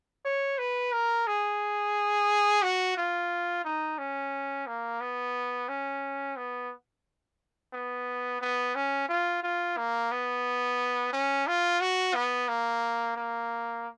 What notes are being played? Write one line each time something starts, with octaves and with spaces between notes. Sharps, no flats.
C#5
B4
A#4
G#4
F#4
F4
D#4
C#4
A#3
B3
C#4
B3
B3
B3
C#4
F4
F4
A#3
B3
C#4
F4
F#4
B3
A#3
A#3